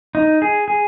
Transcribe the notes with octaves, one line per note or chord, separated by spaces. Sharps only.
D#4
G#4
G#4